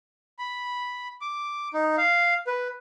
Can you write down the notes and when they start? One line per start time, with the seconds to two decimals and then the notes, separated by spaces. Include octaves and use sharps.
0.39 B5
1.21 D6
1.74 D#4
1.98 F5
2.47 B4